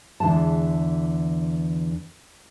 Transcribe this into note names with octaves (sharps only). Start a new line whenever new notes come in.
E2 D3 E3 G#3 A5